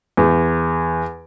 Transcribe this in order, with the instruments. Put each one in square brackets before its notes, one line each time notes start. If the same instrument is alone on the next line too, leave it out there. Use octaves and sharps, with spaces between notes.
[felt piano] E2